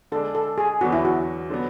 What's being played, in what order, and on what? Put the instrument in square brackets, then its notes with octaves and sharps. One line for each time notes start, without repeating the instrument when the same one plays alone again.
[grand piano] D3 G#3 D4 [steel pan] A4
[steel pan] A4
G#4
[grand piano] E2 D3 F#3 B3 [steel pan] F#4
[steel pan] E4
F#4
[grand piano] D3 F#3 B3